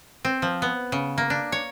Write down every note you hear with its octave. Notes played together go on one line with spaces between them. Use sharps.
C4
F3
B3
C#3
A#3
D4
C#5